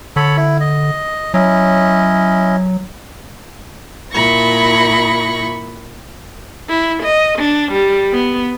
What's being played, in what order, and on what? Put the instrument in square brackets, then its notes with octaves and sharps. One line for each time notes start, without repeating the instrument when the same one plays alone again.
[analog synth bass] D3 [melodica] A4 C#5 B5
[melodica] E4
D#5
[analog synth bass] F#3 [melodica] C#4 E4 D#5
[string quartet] A#2 E4 B5 C#6 A#6
[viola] E4
D#5
D4
G3
B3